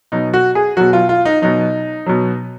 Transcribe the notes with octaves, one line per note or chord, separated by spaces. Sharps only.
B2 F#3 D#4
F#4
G#4
B2 F#3 F#4
F4
F4
D#4
B2 F#3 D#4
B2 F#3